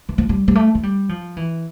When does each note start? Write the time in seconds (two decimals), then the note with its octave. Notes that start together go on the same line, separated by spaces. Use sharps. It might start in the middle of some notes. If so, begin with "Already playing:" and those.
0.09 E3
0.18 F3
0.29 G3
0.48 G3
0.55 A3
0.75 A3
0.83 G3
1.09 F3
1.37 E3